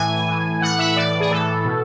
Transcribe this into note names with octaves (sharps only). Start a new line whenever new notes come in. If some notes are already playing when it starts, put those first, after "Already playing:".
Already playing: A2 E3 G#5
A2 E3
A2 E3 F#5
E5
A2 E3 D5
G#4
A2 E3 A4
B2